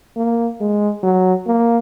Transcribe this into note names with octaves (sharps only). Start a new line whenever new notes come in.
A#3
G#3
F#3
A#3